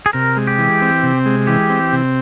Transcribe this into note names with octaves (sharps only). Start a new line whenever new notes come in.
G#4
C3 A#4
G#3
G4
E3
C4
C3
G#3
E3 G4
C4
C3